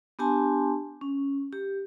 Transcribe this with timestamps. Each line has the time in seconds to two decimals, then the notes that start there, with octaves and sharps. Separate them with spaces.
0.19 B3 D4 G4 G#5 A5 C6
1.01 C#4
1.53 G4